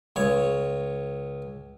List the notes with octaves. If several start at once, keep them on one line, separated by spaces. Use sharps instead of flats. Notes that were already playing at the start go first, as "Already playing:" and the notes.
C#2 C#5 C#6